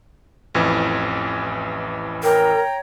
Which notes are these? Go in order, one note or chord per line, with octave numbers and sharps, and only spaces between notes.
A1 F2 E3
A#4 C#5 G5 A#5